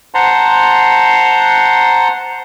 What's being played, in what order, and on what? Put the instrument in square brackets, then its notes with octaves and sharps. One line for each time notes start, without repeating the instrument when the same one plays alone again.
[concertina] C5 F#5 A5 A#5 C6